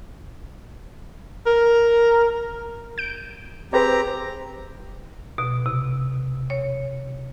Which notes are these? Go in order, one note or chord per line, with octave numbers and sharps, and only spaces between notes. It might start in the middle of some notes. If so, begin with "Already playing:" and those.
A#4
G6 D7
C4 G4 G#4 B4 C5 A#5
B2
C3
C#5